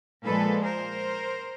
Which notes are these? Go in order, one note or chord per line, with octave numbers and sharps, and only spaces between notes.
A#2 F3 G#3 A4 B4
A#4 C5